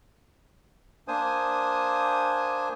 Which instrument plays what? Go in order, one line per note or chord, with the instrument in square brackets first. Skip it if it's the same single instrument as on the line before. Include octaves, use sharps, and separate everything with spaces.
[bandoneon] A#3 D4 C5 G#5 D#6